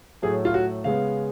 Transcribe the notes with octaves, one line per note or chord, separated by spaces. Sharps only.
A2 F#3 A3 G#4
F4
F#4
C#3 G#3 B3 F5